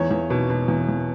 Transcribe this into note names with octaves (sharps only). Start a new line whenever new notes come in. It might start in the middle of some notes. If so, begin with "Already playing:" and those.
Already playing: E2 C#5
E2
B2
B2
E2
E2